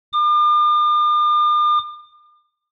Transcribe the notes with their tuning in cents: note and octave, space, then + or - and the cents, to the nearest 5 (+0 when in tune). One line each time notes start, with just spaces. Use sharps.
D6 +45